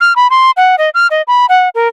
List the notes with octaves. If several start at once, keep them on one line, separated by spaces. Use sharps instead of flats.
F6
B5
C6
F#5
D#5
F6
D#5
B5
F#5
A#4